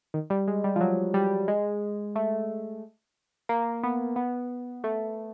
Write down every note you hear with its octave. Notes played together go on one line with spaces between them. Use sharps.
D#3
G3
G#3
G3
F3
F#3
G3
G#3
A3
A#3
B3
B3
A3